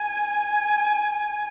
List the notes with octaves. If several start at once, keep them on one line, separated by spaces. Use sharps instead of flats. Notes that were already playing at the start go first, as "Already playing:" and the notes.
Already playing: G#5